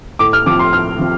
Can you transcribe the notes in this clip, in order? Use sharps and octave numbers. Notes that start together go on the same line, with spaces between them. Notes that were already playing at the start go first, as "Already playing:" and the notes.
A2 D6
F6
F3 C4 D6
C6
A2 F6
F3 C4